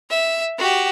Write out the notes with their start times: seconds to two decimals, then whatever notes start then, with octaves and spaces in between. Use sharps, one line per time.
0.10 E5
0.58 F#4 G4